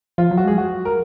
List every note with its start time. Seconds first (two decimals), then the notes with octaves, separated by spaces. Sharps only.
0.18 F3 F4
0.31 F#3
0.37 F#4
0.44 G#3 G#4
0.58 F#4
0.85 A#4